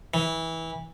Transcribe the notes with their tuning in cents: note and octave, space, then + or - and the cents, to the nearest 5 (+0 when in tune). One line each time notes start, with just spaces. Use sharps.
E3 -20